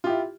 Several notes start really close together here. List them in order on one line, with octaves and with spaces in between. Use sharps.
F4 G4 E4